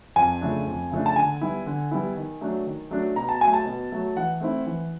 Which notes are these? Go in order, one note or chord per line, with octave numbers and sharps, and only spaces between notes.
F2 G#5
C#3 F3 A3 D4
F2
C#3 F3 A3 D4
A5
D3 G#5
G3 B3 E4
D3
G3 B3 E4
D#3
F#3 A3 D4
D#3
F#3 A3 D4
B2 A#5
A5
F#3 A3 G#5
A5
B2
F#3 A3
E3 F#5
A3 C4 E4
E3